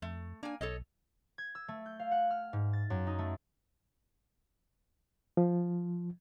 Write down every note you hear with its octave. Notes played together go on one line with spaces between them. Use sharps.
F2 A3
A#3 D4 G#5
B1 A4 C#5 D#5
G#6
E6
A3
G6
F5
F#5
F6
G#2
A6
F#2
D#4
A3
F3